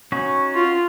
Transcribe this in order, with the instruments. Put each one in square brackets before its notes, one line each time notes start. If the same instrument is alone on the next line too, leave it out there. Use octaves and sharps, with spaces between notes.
[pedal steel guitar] C#4 D#4 F#4
[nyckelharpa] F4